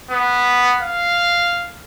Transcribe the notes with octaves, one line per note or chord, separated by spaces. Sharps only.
B3
F5